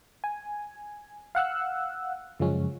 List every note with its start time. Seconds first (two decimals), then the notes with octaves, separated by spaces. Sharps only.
0.24 G#5
1.35 F5 F#5 E6 F#6
2.40 F#2 C#3 F3 G#3 C#4